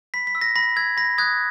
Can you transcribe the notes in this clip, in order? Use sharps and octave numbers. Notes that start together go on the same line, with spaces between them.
B5 B6
B6
E6
A#6
B5 A#6
E6 G#6
B5 A#6
D#6 F#6 G#6